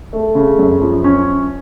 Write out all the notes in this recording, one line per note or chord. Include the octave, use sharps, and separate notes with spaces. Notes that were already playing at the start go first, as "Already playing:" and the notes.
A3
C#3
F#2
F3
C#4